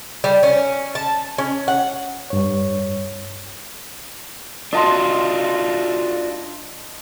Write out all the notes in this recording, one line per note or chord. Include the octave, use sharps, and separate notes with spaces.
G3
C#4
A5
C#4
F#5
G2 C#5
D4 F4 F#4 D#5 A5 C6